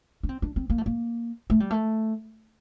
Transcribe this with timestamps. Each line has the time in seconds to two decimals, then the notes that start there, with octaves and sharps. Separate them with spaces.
0.23 D4
0.29 C4
0.42 D4
0.56 C4
0.70 A#3
0.78 A3
0.86 A#3
1.50 A3
1.60 G3
1.71 A3